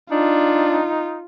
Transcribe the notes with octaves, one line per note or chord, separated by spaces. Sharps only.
D4 D#4 F4